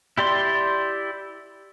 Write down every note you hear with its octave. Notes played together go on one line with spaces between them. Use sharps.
E4 G4 D5 C6